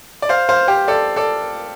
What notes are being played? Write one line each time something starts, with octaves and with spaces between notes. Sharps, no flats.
D5
C5 F5
C5 F5
G4 C5
A4 D5
A4 D5